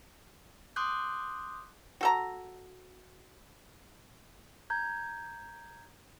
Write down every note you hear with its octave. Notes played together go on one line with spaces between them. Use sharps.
C6 D6 D#6 F#6 G6
F#4 A4 A#5
A#5 G6 G#6